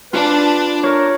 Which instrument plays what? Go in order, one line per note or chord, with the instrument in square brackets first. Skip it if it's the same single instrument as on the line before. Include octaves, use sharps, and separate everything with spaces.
[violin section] D4 [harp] F4 [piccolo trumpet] B4
[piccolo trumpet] A#4 [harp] C#5